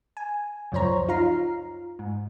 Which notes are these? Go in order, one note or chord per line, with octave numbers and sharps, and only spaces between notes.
G#5
C#2 F#2 F3 C5 C#5 A#5
D#4 F4 F5 A#5 C7
G#2